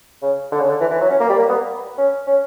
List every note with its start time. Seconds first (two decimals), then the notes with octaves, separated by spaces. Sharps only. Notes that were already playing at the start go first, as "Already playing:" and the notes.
0.22 C#3
0.52 D3
0.60 C#3
0.69 D3
0.81 E3
0.91 E3
1.01 F#3
1.10 C#4
1.20 A#3
1.30 G3
1.39 A#3
1.49 B3
1.98 C#4
2.27 C#4